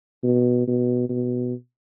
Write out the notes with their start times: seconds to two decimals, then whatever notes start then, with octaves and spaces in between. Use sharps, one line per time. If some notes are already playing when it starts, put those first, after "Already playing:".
0.24 B2
0.67 B2
1.09 B2